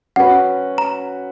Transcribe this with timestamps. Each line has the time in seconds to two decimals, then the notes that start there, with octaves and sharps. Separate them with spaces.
0.16 F#3 C#4 F#4 B4 F#5
0.78 A#5